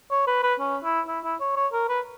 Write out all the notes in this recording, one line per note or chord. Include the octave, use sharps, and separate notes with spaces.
C#5
B4
B4
C#4
E4
E4
E4
C#5
C#5
A#4
B4